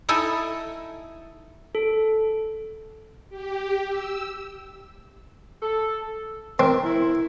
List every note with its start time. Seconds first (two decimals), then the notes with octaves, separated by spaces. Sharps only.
0.09 D#4 E4 A4 G#5
1.75 A4
3.30 G4
3.88 E6
5.63 A4
6.60 C4 A#4
6.84 E4